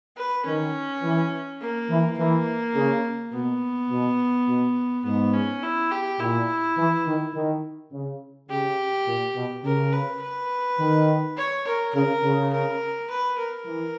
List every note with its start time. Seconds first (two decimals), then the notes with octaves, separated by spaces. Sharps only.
0.17 B4
0.45 D#3 C#4
1.03 E3
1.61 A#3
1.90 E3
2.18 E3 A#3
2.75 C#3
3.32 B2 B3
3.90 B2
4.48 B2
5.05 G#2 B3
5.33 C#4
5.63 E4
5.91 G4
6.20 A#2 E4
6.77 E3
7.06 D#3
7.35 D#3
7.92 C#3
8.49 C#3 G4
9.07 A#2
9.36 B2
9.64 C#3 A#4
9.93 B4
10.22 B4
10.79 D#3
11.37 C#5
11.66 A#4
11.94 C#3 A#4
12.23 C#3
12.53 A#4
13.10 B4
13.38 A#4
13.66 E3